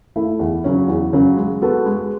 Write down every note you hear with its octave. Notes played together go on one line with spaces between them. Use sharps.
A3 E4
E2
C#3 F#3 C#4
E2
C#3 F#3 C#4
G#3
B3 F#4 A4
G#3